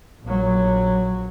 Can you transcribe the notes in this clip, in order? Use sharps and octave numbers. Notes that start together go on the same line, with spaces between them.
A#1 F#3